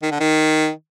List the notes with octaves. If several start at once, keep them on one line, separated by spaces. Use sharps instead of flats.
D#3
D3
D#3